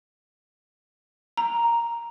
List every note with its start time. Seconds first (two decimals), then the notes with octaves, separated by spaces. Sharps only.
1.37 A#5